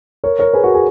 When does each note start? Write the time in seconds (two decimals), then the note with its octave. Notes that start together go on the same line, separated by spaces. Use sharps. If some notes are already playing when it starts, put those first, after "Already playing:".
0.24 A#4 C#5
0.39 A#4 C#5
0.54 G#4 B4
0.64 F#4 A#4
0.74 G#4